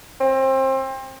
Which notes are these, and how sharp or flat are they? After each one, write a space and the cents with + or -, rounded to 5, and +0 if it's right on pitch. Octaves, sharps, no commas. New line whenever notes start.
C4 +30